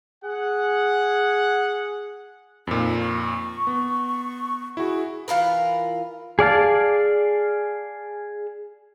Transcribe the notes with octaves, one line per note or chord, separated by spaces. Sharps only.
G#4 F#5
F2 A#2 D#4
C#6
B3
E4 F#4 G#4
E3 F4 A#4 B4
G#4 D5 F5 A5